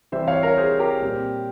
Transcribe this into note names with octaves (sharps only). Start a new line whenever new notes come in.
C3 E3 G3 C5 E5
C#5 F5
A#4 C#5
G#4 C5
G4 A#4
A#2 G3 C4